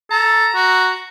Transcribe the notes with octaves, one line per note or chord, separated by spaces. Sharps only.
A4 A#5
F#4